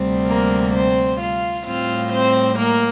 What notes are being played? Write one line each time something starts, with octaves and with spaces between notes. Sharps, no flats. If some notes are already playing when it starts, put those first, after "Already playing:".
Already playing: D2 C3 G3 C4
A#3 A#4
C4 C5
F4 F5
A2 G3 C4 F4 F5
C4 C5
A#3 A#4